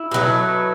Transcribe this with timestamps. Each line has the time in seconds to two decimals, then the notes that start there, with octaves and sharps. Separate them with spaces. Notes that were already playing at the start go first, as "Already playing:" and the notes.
Already playing: E4
0.11 B2 F#3 A3